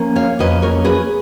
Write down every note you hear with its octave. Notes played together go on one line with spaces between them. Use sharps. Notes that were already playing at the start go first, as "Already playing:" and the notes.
Already playing: F3 A#3 C#4
C#5 F5
F2 F3 A#3 C#4 B4 D#5
A#4 C#5
G#4 B4